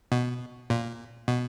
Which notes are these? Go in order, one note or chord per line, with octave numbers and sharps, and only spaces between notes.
B2
A#2
B2